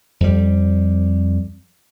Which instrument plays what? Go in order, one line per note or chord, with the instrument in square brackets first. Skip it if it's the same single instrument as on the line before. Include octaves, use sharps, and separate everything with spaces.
[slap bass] F2 G3